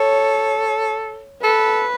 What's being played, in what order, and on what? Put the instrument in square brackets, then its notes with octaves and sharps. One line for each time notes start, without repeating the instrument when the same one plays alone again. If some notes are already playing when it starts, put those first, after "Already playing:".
Already playing: [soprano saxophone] A4 [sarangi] C#5
[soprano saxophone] A4 [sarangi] B4